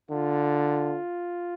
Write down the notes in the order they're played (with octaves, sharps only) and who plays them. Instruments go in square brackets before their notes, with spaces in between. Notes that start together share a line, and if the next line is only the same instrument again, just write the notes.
[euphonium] D3 [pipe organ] F4